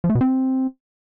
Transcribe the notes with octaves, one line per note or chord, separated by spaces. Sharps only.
F3
A3
B2
C4